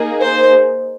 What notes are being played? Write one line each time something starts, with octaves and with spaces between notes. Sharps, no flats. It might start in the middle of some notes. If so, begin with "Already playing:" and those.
Already playing: A#3 D#4 G#4
C5